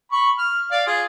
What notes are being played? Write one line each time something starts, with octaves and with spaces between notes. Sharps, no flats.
B5 C#6
F6
D5 F5
F4 G#4